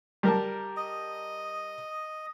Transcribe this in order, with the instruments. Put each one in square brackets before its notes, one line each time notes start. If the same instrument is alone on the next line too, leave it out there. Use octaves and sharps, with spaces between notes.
[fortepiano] G3 A#4 A5
[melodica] D#5